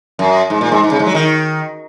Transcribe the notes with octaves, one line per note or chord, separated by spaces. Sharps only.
F#2
G#2
A#2
G#2
G#2
C#3
G#2
F#3
D#3